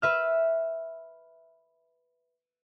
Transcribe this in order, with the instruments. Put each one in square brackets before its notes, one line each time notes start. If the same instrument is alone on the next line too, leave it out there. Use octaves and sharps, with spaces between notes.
[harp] B4 E5 F6